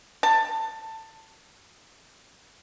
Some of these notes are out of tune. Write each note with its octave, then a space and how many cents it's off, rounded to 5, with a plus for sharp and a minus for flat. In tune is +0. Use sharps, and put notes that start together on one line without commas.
A5 +15